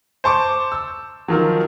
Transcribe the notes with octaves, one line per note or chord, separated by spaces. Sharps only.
C5 A5 C#6 D6
E6
D#3 F3 F#3